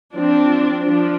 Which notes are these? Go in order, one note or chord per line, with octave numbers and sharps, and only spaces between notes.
F3 C4 D4
F3 D4